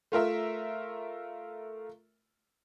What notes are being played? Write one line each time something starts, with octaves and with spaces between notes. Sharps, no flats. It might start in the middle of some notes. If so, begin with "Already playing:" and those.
A3 F4 A#4 E5